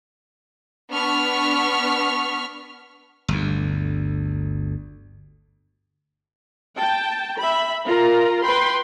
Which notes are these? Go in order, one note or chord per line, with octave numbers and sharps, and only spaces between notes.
B3 D4 C#6 F6 B6
G1 D2
G5 A5
E5 B5
F4 A#4 A#5
B4 G5 B5 C6